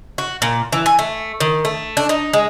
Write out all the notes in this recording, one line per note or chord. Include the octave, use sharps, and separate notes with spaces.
F#4
A#2
E3
G#5
A3
D#3
A3
D4
D#4
G#3